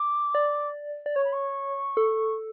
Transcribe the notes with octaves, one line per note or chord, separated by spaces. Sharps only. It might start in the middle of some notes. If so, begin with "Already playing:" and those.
Already playing: D6
D5
D5
C#5 C#6
B5
C#6
A4